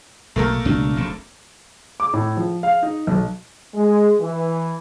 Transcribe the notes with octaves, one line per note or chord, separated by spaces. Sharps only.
B1 B2 A3 A#3 A#4
C#2 B2 D4
F1 D2 C#3
D6
A2
F3
F5
D#4
B1
G#3
E3